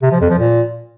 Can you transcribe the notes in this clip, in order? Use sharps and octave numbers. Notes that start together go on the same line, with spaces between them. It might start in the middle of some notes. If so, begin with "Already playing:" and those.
C3
F3
F2
F3
A#2